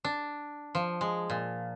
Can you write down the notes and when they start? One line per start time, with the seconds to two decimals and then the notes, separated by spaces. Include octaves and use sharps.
0.04 D4
0.75 F3
1.01 G#3
1.30 A#2